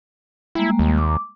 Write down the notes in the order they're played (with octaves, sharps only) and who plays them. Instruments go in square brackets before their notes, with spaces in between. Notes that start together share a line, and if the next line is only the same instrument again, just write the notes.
[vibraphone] G3 G#3 A#3 [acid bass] E4
[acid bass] D#2
[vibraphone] D6